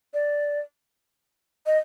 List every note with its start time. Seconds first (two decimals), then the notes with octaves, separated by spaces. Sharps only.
0.14 D5
1.66 D#5